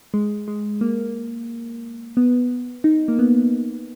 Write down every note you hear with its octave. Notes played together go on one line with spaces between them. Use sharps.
G#3
G#3
A#3
B3
D#4
A#3
B3